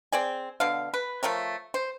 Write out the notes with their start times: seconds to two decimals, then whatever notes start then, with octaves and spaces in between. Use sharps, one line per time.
0.12 C4 G#4 D5 G#5
0.60 B2 D3 F5
0.94 B4
1.23 F3 A3 A#4 C#5
1.74 C5